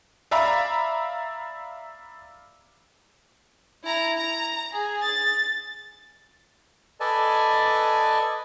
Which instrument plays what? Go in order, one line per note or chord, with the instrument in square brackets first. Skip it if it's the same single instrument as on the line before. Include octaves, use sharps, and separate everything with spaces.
[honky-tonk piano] D5 E5 F5 A#5 B5
[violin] E4 A#5
A#5
G#4
A6
[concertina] A4 B4 D5 D#5 G#5 A5